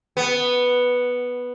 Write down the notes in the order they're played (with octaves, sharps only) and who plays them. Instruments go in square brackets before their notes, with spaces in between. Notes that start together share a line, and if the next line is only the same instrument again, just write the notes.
[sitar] B3